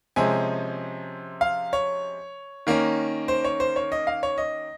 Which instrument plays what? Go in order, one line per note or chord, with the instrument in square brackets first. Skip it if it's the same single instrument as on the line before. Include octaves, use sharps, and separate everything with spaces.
[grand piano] C3 F3 G#3 C#4 G#5
F5
C#5
D#3 A#3 C#4
C5
C#5
C5
C#5
D#5
F5
C#5
D#5